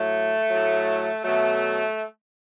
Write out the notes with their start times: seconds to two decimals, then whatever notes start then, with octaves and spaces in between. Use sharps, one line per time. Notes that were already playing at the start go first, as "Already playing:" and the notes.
Already playing: A2 F#3 A3
0.49 A2 F#3
1.23 B2 F#3 A3